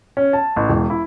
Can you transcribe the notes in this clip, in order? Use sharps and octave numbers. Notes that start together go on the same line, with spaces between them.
C#4
A5
A1
E1
E4